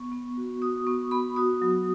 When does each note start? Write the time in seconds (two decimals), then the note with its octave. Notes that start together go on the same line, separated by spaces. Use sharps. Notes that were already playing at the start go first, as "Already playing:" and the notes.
Already playing: B3 C#6
0.12 B3
0.37 F#4
0.61 F#4 D#6
0.87 B3 C#6
1.11 B3 B5
1.36 F#4 D#6
1.62 F#3